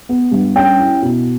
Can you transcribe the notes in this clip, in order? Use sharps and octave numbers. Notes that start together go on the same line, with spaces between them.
B3
G2
C#4 G5
E4
B2